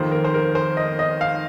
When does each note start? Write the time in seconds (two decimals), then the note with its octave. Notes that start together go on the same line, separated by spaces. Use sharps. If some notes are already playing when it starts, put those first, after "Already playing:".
Already playing: F2 D#3 A#3 C5
0.12 A#4
0.25 C5
0.34 A#4
0.55 C5
0.77 D#5
0.99 D#5
1.21 F5